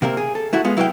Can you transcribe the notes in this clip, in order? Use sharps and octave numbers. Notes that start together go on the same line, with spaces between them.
C3 A#3 C4 A#4
G#4
A4
A3 E4 F#4
G#3 B3 F4
F#3 E4 B4 C5 F5 G5